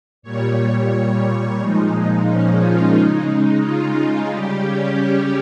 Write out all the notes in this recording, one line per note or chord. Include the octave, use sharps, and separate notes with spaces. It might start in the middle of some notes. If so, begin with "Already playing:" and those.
A#2 G3 C#5
C#5
A#2 F3 G#3 D#4
D#4
C#4
F4
C#3 G#3 D#4
D#4
F4
F4
C#3 G3 G4
C#4
C#4